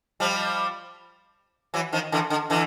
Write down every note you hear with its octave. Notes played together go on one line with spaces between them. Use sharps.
F3 G3
E3 F#3
D#3 F3
D3 E3
D3
D3 E3